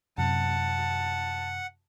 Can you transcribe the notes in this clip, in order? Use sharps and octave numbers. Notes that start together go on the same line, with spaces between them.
F#2 C3 F#5 A5